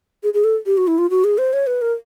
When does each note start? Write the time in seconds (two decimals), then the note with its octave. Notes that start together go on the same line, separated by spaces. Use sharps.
0.23 G#4
0.34 G#4
0.44 A4
0.66 G4
0.78 F#4
0.87 E4
0.98 F4
1.10 F#4
1.24 G#4
1.38 C5
1.53 C#5
1.67 B4
1.82 A#4